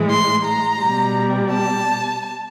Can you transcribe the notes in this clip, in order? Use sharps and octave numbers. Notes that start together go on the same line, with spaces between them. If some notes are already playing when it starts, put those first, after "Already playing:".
Already playing: A2 E3 G#3
C6
A#5
B2 G3
A5